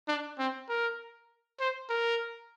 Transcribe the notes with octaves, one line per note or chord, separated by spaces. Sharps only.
D4
C4
A#4
C5
A#4